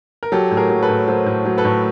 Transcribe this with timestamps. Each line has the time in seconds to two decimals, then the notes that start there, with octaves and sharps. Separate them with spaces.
0.23 A#4
0.32 F#3 G4 A4
0.51 A2
0.57 G#4 A#4
0.70 F#3
0.82 A4 B4
0.89 A2
1.08 F#3 A#4 C5
1.26 A2
1.45 F#3
1.58 A4 B4
1.65 A2